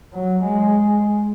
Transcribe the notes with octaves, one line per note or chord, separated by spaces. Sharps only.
F#3
G#3